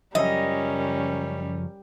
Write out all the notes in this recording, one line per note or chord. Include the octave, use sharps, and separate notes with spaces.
F#2 C#3 F3 G3 C#4 A#4 D#5